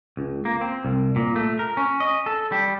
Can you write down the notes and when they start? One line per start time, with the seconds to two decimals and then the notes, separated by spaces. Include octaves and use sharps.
0.17 C#2
0.45 A#3
0.61 C4
0.85 C2
1.16 A#2
1.36 A3
1.59 A#4
1.77 C#4
2.00 D#5
2.26 A4
2.52 G3